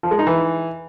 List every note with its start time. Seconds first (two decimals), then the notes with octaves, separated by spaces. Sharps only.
0.03 F3
0.11 G#3
0.19 D#4
0.27 E3